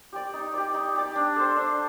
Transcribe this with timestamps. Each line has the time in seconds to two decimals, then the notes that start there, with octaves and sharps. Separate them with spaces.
0.13 G4 D5
0.33 D#4
0.54 G4 D5
0.74 D#4
0.95 G4 D5
1.16 D4
1.36 A4 C5
1.57 D4